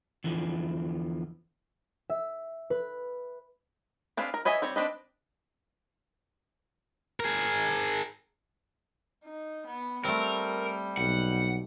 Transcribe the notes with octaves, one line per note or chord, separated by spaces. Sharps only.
E2 D3 E3 F3
E5
B4
C4 D4 G#4 B4 F5
A#4
B4 C#5 D#5 E5 G#5
G3 C4 C#5
C4 D4 B4 D#5
G#4 A#4
D#4
B3
G3 A3 C4 A#4
B1 F#5